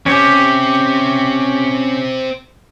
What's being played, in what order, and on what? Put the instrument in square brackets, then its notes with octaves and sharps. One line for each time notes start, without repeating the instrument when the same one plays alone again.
[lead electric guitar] C4 E5 [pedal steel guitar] C#4 G4